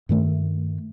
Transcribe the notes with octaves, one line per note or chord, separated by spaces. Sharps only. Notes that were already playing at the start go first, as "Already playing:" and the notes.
G2 D#3 A3